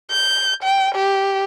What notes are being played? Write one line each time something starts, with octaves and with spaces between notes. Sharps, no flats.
G6
G5
G4